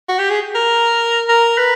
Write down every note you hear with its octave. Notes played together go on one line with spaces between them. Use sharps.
F#4
G4
G#4
A#4
A#4
B4